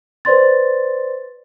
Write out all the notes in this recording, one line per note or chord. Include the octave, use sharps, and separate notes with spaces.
B4 C5 D5 C6 A6